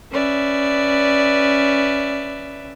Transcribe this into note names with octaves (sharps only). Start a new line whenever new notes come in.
C#4 B4 D5 E5